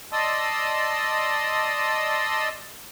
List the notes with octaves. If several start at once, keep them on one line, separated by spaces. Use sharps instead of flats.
D5 D#5 A5 C6 D#6 E6